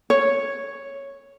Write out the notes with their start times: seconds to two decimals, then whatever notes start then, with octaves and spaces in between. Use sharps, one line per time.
0.10 C#5